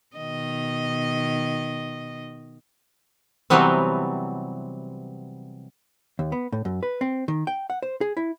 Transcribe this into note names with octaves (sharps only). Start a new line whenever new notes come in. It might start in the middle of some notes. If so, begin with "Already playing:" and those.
B2 D#3 D#5
C3 E3 F#3 G3 B3 C4
D#2
B3
A2
F#2
B4
C4
D#3
G5
F#5
C5
G#4
E4